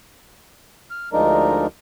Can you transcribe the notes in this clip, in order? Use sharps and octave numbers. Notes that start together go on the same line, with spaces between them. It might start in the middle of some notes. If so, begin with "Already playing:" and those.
F6
D2 F3 G#3 D4 D#4 A#4